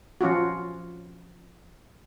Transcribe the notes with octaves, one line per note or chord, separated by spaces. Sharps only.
F3 C#4 F4 F#4